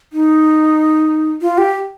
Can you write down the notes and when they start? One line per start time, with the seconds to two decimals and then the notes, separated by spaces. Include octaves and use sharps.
0.13 D#4
1.42 F4
1.58 G4